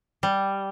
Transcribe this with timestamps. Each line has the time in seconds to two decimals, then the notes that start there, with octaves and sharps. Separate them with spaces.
0.23 G3